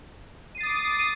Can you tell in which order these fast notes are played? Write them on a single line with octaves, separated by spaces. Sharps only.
D#7 C7 A6 D#6 D6